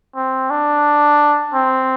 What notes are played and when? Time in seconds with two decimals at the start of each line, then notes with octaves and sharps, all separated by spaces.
0.16 C4
0.50 D4
1.54 C4